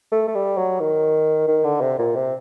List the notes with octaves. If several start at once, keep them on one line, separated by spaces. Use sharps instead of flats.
A3
A3
G3
F#3
D#3
D#3
D3
C3
A#2
C3